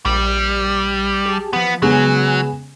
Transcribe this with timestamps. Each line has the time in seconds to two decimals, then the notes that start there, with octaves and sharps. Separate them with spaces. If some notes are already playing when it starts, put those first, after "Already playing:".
0.06 A#1 G3
1.26 G4 G#4 A5
1.53 E3 F3 B3
1.82 C#3 F#3 G#3 B3 G#5 E7